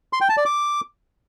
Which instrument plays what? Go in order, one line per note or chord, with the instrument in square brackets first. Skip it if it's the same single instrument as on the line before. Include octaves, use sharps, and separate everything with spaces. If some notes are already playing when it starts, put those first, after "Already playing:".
[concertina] C6
G5
A5
D5
D6